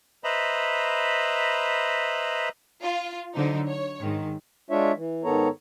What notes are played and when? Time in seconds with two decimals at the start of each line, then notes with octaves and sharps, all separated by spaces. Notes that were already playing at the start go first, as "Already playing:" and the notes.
0.24 B4 C5 D#5 E5 A#5 B5
2.83 F4
3.34 D3 F#3 D#4 C5
3.67 C#5
4.00 G#2 D#3
4.70 G#3 D4 F4 C#5 E5
4.96 E3
5.24 G#2 D#3 B3 A4 C#5 A#5